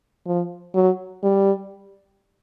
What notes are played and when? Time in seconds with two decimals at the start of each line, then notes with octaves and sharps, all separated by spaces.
0.26 F3
0.75 F#3
1.23 G3